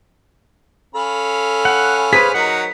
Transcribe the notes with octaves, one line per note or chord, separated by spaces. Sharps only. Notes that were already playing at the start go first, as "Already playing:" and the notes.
C#4 A4 F5 B5
F#5
G#4 B4 C5 B6
F#3 D#4 A#4 F#5